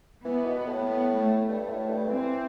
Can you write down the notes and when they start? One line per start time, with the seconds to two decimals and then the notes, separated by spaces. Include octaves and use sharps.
0.25 E3 B3
0.46 B2
0.67 A2
0.87 B3
1.17 A3
1.48 G2
1.69 A2
1.89 G2
2.09 E3 C4